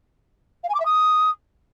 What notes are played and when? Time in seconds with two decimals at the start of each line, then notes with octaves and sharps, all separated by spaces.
0.63 F5
0.69 G#5
0.74 D6
0.80 E5
0.85 D#6